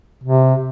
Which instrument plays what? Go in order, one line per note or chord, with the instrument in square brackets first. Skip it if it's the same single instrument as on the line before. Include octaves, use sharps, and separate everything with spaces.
[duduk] C3